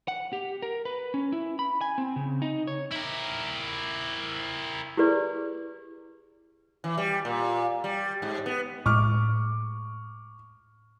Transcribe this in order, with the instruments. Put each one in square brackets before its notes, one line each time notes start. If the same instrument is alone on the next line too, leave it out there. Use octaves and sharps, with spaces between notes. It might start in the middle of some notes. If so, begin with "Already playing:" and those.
[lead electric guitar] F#5
G4
A#4
B4
C#4
E4
B5
G#5
C4
C#3
D#4
C#5
[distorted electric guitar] E4 A#4
[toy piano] E4 G4 G#4 B4 D5
[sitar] E3
G3
A#2
G3
G#2
B3
[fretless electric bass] A2 G#3 [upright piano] C#6 D6 F6